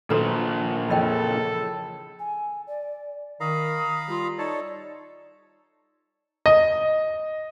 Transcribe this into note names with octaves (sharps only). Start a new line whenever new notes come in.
A#1 A#2 D#3 F#3 A4 B4 C5 A#5
F2 C#3 E3 D4 A4 D#5 G5
G#5
D5
D#3 F5 A#5 B5 D#6
G3 F4
D#4 A4 C#5 D5 A5
D#5